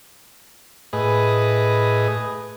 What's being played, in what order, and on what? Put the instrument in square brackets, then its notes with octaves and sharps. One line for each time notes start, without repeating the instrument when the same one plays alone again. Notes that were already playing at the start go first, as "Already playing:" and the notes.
[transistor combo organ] A2 G#4 B4 D#5